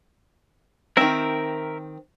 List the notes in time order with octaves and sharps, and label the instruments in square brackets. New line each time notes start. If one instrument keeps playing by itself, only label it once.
[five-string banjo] D#3 C4 [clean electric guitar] A#4 E5